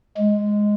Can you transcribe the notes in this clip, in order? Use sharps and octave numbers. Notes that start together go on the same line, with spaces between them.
G#3